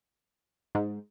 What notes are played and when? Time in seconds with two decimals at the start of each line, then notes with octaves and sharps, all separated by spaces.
0.75 G#2